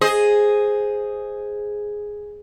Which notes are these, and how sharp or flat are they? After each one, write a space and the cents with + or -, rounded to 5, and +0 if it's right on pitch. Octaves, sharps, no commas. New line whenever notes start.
G#4 +0 C5 +0 D#5 +0